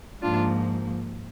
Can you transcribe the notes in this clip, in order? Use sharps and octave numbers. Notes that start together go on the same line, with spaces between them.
G#2 F3 A#3 D4 F4